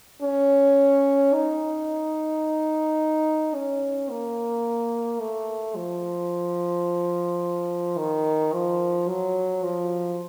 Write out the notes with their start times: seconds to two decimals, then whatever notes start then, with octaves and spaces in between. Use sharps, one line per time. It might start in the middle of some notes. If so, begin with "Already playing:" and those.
0.22 C#4
1.33 D#4
3.55 C#4
4.10 A#3
5.20 A3
5.76 F3
7.97 D#3
8.53 F3
9.08 F#3
9.63 F3